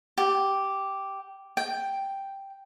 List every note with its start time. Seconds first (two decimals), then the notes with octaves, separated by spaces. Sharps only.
0.18 G4
1.57 G5